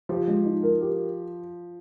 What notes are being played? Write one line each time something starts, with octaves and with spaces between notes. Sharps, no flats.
F3 G4
G#3
D#4
A#4
G4